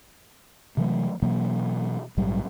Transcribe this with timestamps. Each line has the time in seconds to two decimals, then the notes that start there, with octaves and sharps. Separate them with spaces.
0.77 C3 E3 F#3 A3
1.22 B2 E3 F#3 A#3
2.17 A#1 G#2 F#3 G3